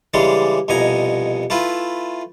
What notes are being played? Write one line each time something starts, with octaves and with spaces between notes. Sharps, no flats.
C#3 E3 G3 G#3 D4 C6
C2 F2 B2 D#5 G#5 A#5
A3 E4 F4 B4